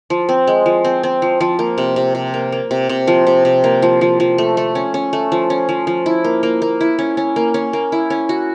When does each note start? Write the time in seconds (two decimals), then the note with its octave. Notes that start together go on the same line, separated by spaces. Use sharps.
0.10 F3
0.29 C4
0.47 G#3
0.66 F3
0.84 C4
1.03 C4
1.22 F3
1.40 F3
1.59 A#3
1.78 C3
1.96 C3
2.15 C3
2.34 A#3
2.52 A#3
2.71 C3
2.89 C3
3.07 F3
3.27 C3
3.45 C3
3.64 A#3
3.82 F3
4.01 F3
4.20 F3
4.38 A3
4.57 A3
4.75 C#4
4.94 C#4
5.13 A3
5.32 F3
5.50 C#4
5.69 F3
5.87 F3
6.06 E4
6.24 A#3
6.43 A#3
6.62 A#3
6.81 E4
6.99 C#4
7.17 C#4
7.36 A#3
7.54 C#4
7.73 A#3
7.92 E4
8.10 C#4
8.29 F#4